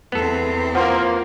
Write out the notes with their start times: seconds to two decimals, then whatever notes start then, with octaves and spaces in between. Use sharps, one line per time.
0.12 E2 B3 C4 A4
0.75 F3 A#3 F#5 C6